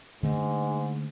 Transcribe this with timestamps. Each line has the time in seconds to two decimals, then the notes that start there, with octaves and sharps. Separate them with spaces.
0.23 G#2 D3 A3 A#3